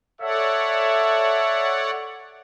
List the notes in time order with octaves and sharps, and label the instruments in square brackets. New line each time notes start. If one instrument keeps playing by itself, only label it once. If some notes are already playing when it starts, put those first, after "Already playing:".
[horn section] A4 E5 [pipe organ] C#5 D5 F#5